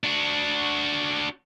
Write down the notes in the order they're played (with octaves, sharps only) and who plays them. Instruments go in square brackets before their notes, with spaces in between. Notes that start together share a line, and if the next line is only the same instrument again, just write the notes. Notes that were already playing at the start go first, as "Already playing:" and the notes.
[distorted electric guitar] D4 F#4